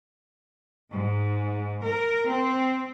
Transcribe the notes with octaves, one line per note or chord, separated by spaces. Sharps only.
G#2
A#4
C4